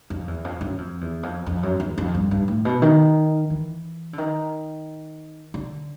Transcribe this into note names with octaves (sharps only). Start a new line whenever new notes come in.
F2
E2
F2
F#2
F2
E2
F2
F2
F#2
E2
F2
G2
G2
A2
B2
D#3
E3
D3
D#3
D3